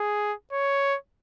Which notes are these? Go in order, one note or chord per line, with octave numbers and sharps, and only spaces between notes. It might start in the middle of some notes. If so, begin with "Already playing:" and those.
Already playing: G#4
C#5